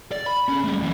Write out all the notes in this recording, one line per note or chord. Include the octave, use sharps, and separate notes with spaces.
D5
B5
C#4 G#4
G3 A3
F#2 E3